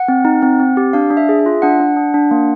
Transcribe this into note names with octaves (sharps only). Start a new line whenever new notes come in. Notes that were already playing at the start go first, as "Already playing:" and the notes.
Already playing: F#5
C4
D#4
C4
C4
G4
D4 F5
D4
E5
G#4
E5
F4
D4 F#5
D4
D4
D4
A#3